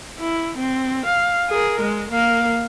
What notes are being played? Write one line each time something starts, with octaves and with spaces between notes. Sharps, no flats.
E4
C4
F5
G#4 A#4
G#3
A#3 F5